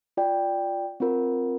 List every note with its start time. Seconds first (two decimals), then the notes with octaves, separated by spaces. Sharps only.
0.17 F4 D5 G5
1.00 C4 F4 A#4